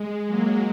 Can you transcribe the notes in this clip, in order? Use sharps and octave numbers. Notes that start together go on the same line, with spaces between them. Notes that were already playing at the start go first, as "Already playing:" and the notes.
Already playing: G#3
F#3 A#3